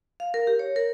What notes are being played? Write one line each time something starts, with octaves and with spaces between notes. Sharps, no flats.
F5
A#4
G4
C#5
A#4